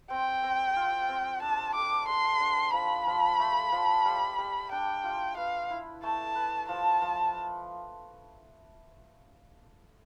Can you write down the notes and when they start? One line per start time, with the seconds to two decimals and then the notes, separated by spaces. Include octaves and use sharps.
0.10 C4 G5
0.43 C4
0.76 F4
1.09 C4
1.42 D4 A5
1.75 A4 D6
2.08 D4 C6
2.41 D4
2.73 F3 B5
3.07 F3
3.40 A3
3.72 F3
4.05 G3
4.39 G3
4.72 D4 G5
5.04 F4
5.37 B4 F5
5.70 E4
6.03 A3 A5
6.35 B4
6.69 F3 A5
7.02 F3